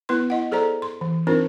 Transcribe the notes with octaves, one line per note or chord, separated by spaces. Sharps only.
B3 E4 B4 C6
E4 D#5 F#5
G#4 A4 C5 D5 A#5
C6
E3
C4 D4 D#4 F4 A#4 C5